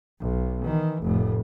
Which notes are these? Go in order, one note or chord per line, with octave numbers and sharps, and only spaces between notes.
B1
D#3 E3
F1 A2